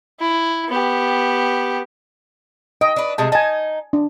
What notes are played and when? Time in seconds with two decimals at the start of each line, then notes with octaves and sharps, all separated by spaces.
0.20 E4
0.69 B3 G4
2.81 D#5 G5
2.96 D4 B4
3.18 C3 G#3 A3 A5
3.32 D#4 G#5 A5
3.93 D4